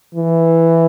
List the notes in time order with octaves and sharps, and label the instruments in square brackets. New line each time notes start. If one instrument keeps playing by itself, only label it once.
[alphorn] E3